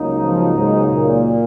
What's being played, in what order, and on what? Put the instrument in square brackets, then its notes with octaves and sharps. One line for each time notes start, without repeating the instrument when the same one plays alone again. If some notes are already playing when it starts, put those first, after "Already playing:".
Already playing: [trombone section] C#2 C#3 F#3 A#3 D#4
[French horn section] F3
G#2
A#2